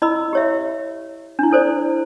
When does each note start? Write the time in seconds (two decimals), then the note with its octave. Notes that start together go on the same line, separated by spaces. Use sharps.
0.02 E4 D#5 B5 E6
0.33 G4 C#5 E5
1.39 D4 E4
1.51 E4 A4 C5 D5